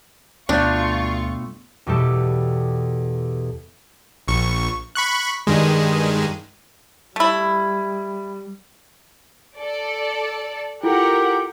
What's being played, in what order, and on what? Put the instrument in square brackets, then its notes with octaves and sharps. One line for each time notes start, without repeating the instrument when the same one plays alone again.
[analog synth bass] D2 [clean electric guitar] G2 B2 A3 [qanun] D4 [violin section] F4 C#6
[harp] E2 B2 G3 G4 A4
[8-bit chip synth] A#1 C#6
B5 C#6 F#6
G2 D#3 G#3
[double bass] G3 [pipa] A3 E4
[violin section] A4 D5
[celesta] E4 F4 A4 [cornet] G4 [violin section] A#4 F#5 G5